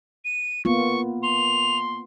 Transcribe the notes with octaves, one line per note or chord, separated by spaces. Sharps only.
D#7
A#3 B3 F4 C#6
C6 F7